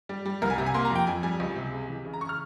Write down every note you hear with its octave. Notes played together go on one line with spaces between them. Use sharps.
G3
G3
C2 A#4
G#5
C3 A#5
G#5
A#3 C6
A#5
F2 G5
F2 G#5
G3 G#5
C#2
C3
G#3
E3
C#3
A#5
C#3 C#6
F6